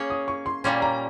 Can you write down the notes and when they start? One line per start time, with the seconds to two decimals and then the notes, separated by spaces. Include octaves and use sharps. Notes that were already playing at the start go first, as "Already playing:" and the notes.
Already playing: A#3 C#4 G#4 C#5
0.10 D#6
0.28 C#6
0.46 C6
0.64 A#2 G3 A#3 C#4 C6
0.82 A#5